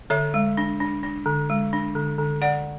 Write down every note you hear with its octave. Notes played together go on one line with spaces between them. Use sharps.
D3 C#5 E5
G#3
D4
D4
D4
D3
G#3
D4
D3
D3
D3 D5 F#5